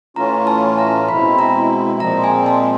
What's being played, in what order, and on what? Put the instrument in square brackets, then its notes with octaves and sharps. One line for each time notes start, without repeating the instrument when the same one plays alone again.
[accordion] A2 E3 A3 C#4 F4 [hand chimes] A#5
[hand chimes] A5
A#5
[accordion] B2 G#3 C4 E4 [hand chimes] B5
[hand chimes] A#5
[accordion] A#2 F3 G#3 C4 [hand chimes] A#5
[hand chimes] G#5
A5